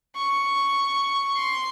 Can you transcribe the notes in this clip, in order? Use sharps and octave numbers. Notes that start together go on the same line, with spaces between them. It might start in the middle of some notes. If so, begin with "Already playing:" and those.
C#6
C6